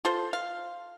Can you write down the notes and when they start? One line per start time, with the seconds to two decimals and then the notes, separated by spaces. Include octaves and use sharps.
0.05 F4 A4 C5
0.33 F5